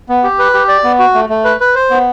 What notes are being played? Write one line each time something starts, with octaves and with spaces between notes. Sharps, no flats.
B3
G4
B4
G4
D5
B3
F#4
A3
A3
B4
B4
C5
B3